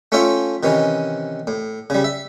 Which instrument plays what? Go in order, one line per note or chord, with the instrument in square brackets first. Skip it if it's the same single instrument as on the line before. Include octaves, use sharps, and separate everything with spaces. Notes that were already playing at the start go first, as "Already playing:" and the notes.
[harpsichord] A3 C#4 F4 C#5 E5 G5
C3 D#3 E3 C#4
A2
C#3 G3
E5